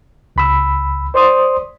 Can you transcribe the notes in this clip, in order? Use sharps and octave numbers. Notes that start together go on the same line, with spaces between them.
C#2 B5 E6
C5 D5 C6 D#6